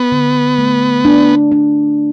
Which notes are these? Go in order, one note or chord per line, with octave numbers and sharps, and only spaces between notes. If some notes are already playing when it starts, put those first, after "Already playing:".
Already playing: B3
D3
A3
D4
D4